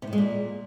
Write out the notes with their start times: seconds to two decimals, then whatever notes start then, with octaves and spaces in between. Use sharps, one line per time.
0.02 C3
0.07 A2
0.13 G#3
0.18 A#2